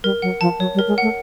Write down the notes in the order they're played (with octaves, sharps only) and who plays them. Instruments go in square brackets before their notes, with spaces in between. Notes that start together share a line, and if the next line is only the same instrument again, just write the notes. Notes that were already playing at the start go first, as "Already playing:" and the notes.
[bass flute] G3 [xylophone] A#4
[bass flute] F#3 [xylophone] F#5
[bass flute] F3 [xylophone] A5
[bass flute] F#3 [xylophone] C#5
[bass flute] G3
[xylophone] A#4
[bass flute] G#3
[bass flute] A3 [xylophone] F#5